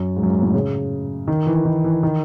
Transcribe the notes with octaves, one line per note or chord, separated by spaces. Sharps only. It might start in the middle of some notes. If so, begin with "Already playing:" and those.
Already playing: F#2
G#2
F#2
G#2
A2
C#3
D#3
E3
D#3
E3
D#3